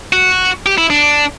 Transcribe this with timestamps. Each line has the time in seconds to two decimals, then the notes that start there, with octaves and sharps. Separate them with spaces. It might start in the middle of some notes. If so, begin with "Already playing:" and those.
0.13 F#4
0.66 G4
0.78 E4
0.90 D4